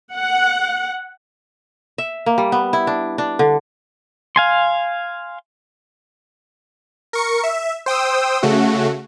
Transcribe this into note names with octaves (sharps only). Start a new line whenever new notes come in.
F#5
E5
A#3
G3
B3
E4
D4
D4
D3
F5 G#5 C6
A#4 C#6 C#7
E5
C5 G5 D#6 E6
C#3 A3 F#4